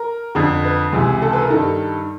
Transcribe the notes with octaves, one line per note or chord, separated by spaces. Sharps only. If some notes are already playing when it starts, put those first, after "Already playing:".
Already playing: A#4
F2 D3
B4
C#2 C3 E3
A4
B4
A#4
G2 D#3 A4